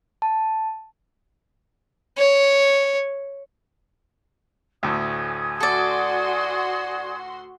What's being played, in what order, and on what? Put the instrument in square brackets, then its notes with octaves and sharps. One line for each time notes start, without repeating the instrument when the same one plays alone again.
[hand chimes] A5
[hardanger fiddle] C#5
[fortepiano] D2 A2 [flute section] G#5 D#6 G#6
[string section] F#4 C6 [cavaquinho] A4 D5